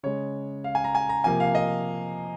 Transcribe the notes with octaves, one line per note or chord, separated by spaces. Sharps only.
C#3 G#3 C#5
F5
G#5
A#5
G#5
A#5
C3 F3 A#3 G#5
F5
D#5